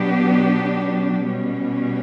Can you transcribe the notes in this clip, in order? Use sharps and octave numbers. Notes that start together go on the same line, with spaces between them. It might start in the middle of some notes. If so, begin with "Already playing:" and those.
Already playing: B2 F#3 B3 D4 G4
B2 G3 C#4